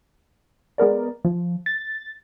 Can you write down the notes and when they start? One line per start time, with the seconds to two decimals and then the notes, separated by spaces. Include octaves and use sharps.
0.78 G#3 B3 A#4 D5
1.25 F3
1.66 A6